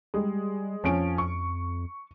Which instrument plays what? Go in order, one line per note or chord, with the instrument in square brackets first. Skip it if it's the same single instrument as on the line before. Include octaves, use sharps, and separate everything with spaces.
[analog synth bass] G3 [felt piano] G#3
[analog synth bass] F2 [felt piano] F3 C#4 D7
[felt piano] C#6